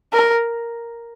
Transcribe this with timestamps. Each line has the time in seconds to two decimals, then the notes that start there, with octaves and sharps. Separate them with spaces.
0.13 A#4